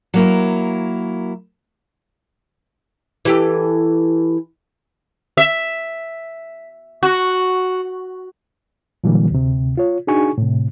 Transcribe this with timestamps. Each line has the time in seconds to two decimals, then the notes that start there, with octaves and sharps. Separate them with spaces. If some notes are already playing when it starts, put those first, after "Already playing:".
0.14 F#3 A#3 E4
3.25 E3 G4 A4
5.37 E5
7.03 F#4
9.04 A#2 D3 E3 F#3 G3 A#3
9.30 D2 C3
9.77 F4 C#5
10.07 D4 D#4 F#4 G#4 G#5 C#6
10.38 A2 C3